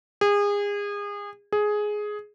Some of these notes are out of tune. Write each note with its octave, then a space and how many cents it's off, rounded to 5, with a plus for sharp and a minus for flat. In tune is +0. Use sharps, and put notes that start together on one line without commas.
G#4 -30
G#4 +10